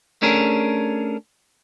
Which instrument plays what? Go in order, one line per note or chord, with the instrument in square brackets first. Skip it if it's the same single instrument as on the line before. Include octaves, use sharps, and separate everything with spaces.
[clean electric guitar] A3 C#4 D4 G#4 A#4